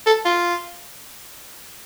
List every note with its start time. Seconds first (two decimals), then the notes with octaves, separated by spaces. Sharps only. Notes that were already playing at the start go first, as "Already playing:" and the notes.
0.06 A4
0.25 F4